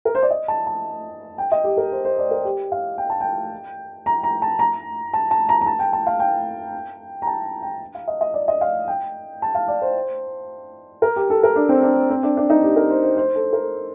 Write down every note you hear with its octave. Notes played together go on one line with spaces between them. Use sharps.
A#4
C5
D5
D#5
A5
A5
G5
D#5
G4
A#4
C5
C5
D5
A#4
G4
F5
G5
A5
G5
A#5
A#5
A5
A#5
A5
A5
A#5
A#5
A5
G5
A5
F5
G5
A#5
A5
G5
F5
D#5
D#5
D5
D#5
F5
G5
A5
F5
D5
C5
A#4
G4
A4
A#4
D4
C4
D4
C4
D4
D4
D#4
G4
A#4
C5
C5
C5
A4
A#4